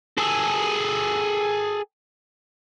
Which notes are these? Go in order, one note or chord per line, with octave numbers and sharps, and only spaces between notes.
G#4 A4